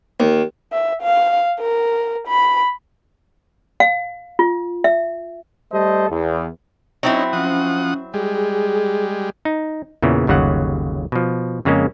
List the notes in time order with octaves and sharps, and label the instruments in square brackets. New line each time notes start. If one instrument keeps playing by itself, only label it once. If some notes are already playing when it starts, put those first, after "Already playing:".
[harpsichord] D#2
[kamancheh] E5
F5
A#4
B5
[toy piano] F5
F4
E5
[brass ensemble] G3 A3 A4 C5 D#5
E2
[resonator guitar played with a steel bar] F#3 C4 E4 [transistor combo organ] C#4 D#4
[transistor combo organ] F3 F#5 D#6 [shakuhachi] C#4
[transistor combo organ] G3 G#3 [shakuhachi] G#4
[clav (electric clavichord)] D#4
E2 A#2 C#3 E3
G1 D#2 C#3 F#3 F#5
B2 F3
F2 C#3 G#3 A#3 C#4